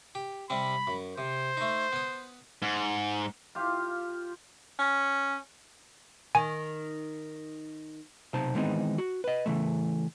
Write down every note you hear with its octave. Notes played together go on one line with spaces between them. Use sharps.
G4
C3 G3 C4 B5
F#2
C3 C5
A3 D#4
B3 D#6
G#2
F4 G4 F5
C#4
D#3 G#5
B1 C3 D#4 C5 A5
D#3 E3 G#3 B3 C4 D#4
F#4
B4 D#5
C#3 E3 A3